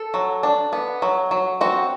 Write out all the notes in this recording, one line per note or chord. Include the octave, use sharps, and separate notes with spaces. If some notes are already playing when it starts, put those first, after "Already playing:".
Already playing: A4
F#3
D4
B3
F#3
F#3
C4 F#4